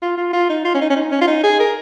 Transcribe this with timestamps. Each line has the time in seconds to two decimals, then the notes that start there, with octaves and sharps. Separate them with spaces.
0.02 F4
0.17 F4
0.33 F4
0.50 D#4
0.65 F4
0.75 C#4
0.81 D#4
0.90 C#4
0.96 D#4
1.12 C#4
1.21 F4
1.28 D#4
1.44 G#4
1.60 A#4